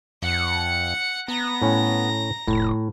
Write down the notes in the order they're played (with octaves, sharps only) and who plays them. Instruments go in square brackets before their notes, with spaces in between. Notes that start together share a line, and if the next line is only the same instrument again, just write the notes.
[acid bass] F2 [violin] F#5 C#7
[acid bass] B3 [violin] A#5 A#6
[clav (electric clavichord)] A2 C#4
[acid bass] F1 [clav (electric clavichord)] A2